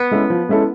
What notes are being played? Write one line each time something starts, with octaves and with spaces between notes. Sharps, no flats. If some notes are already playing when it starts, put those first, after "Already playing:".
Already playing: B3
G#3 C#4 E4 A4
F3
G#3 C#4 E4 A4